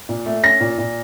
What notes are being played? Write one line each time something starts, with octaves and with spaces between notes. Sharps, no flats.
A#2
A3
C#4 A#6
A#2
A#2